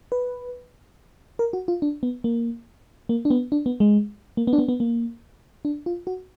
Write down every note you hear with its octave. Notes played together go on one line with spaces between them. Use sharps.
B4
A#4
F#4
F4
D4
B3
A#3
A#3
D4
B3
D4
B3
G#3
A#3
B3
D4
B3
B3
A#3
D4
F4
F#4